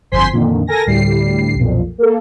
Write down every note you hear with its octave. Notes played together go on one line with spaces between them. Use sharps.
G1 F2 C5 G#5 C6 B6
F2 A#2 D3 D#3
A4 A#4 G#5 A#6
D2 A2 G3 C7
B1 F2 A#2
A#3 A4